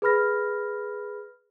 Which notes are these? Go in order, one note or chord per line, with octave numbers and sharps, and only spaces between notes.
G#4 B4 B5 F6 A#6